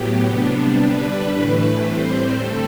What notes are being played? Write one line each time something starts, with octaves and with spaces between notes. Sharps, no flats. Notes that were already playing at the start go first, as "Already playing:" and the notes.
Already playing: A2 F#3 B3 G4
C3 G3 B3 D4
D3 G3 D4 B4
A2 E3 A3
A2 G3 C4 C5
D3 A3 C4 A4